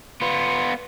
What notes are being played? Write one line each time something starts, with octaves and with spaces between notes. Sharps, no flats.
B3 F4